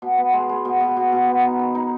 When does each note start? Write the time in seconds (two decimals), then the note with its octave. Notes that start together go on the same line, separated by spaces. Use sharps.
0.02 B2
0.18 B3
0.33 G#3
0.49 G#3
0.65 B2
0.80 B2
0.97 B2
1.12 B2
1.28 B3
1.44 D#4
1.59 D#3
1.75 D#4